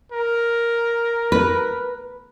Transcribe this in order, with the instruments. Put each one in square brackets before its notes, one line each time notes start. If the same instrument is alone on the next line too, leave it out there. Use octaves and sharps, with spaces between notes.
[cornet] A#4
[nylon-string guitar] B4